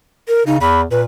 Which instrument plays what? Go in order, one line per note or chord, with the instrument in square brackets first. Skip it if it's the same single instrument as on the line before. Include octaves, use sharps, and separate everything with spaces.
[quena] A#4
[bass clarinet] C#3 [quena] D#4
[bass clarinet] E2 [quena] B5
[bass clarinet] A#2 [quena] B4